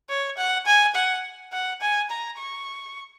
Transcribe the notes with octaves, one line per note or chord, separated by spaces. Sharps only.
C#5
F#5
G#5
F#5
F#5
G#5
A#5
C#6